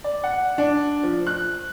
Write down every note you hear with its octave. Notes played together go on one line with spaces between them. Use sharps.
D5
F#5
D4
F3
F#6